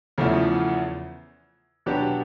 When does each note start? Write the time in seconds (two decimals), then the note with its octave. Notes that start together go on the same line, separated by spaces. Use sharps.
0.18 E2 C#3 F3 A3
1.86 B2 F#3 B3 D4 G4